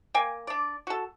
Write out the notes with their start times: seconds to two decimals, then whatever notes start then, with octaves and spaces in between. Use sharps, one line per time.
0.14 A#3 G5 G#5
0.47 D4 D5
0.87 F#4 A4